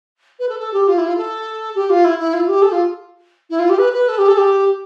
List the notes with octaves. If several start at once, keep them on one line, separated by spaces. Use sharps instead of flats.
B4
A4
A4
G4
F4
E4
F4
A4
G4
F4
E4
E4
F4
G4
A4
F4
E4
F4
G4
B4
B4
A4
G4
A4
G4